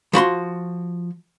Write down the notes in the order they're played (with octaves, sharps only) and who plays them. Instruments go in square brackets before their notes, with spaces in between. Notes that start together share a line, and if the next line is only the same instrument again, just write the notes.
[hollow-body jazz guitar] F3 F#4 B5 C6